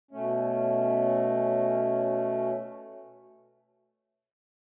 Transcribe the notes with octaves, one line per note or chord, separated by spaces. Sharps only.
B2 A3 C#4